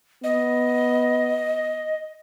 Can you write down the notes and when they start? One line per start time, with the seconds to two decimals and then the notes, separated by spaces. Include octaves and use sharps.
0.24 B3 D#5